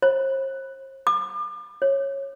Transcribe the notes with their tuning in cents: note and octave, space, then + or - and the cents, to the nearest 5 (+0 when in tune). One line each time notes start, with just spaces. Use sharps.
C5 +40
D6 +35
C#5 -15